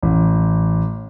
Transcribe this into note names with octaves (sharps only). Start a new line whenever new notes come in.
A1